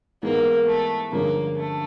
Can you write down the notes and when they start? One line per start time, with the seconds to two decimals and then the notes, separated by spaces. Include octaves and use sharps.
0.23 G#2 E3 G#3 A#3 B3
0.67 A3
1.11 G2 D3 F3 G#3 A#3 C#4
1.56 A3